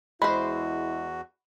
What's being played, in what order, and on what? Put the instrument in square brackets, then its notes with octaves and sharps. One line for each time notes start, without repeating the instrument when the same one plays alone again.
[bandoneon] E2 F#4 [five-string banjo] G#3 C5 [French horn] E4 [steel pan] B5